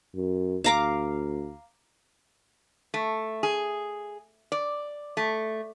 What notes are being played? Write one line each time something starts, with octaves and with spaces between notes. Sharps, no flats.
F#2
D2 F5 A#5 D6
A3
G#4
D5
A3